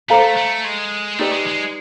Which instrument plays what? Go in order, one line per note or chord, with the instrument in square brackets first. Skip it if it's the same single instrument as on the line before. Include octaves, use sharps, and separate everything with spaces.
[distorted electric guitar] A3 [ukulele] A4 C5 F5 A#5
[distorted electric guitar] A3
G#3
[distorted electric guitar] A3 [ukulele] D#4 G4 B4 D5
[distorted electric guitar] G#3
G#3